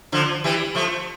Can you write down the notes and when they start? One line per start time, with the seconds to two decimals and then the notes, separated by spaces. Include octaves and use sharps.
0.12 D3 F3
0.44 E3 G3
0.75 F3 A3